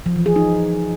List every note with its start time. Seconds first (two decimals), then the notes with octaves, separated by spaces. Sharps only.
0.06 F3
0.16 E3
0.26 G#4
0.36 D#4